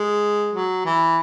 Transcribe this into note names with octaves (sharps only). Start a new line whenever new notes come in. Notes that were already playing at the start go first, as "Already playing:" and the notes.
Already playing: G#3
F#3
E3